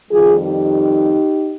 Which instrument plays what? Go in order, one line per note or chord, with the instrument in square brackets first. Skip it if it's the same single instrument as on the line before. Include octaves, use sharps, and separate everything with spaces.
[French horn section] F2 D#3 G3 F4 G#4
D#4 G4